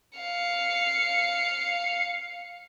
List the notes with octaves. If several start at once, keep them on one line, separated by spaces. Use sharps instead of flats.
F5 C#7